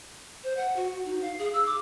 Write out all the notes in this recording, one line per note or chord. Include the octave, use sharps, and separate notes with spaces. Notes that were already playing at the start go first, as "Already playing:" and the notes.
C5
F#5
F#4
D#4
F5
G#4
E6
D6